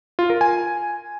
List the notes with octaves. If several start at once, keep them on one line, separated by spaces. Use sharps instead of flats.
F4
A#4
G#5